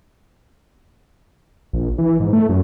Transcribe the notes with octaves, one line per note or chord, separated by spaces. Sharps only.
A#1
E3
G#2
A3
F#2